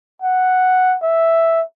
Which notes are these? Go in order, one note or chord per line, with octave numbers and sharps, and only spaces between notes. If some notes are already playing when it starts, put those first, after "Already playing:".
F#5
E5